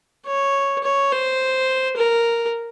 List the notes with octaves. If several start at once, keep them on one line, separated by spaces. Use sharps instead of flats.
C#5
C#5
C5
A#4